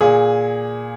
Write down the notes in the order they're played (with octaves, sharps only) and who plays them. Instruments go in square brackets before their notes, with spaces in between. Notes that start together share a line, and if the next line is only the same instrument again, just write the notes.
[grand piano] A#2 G#4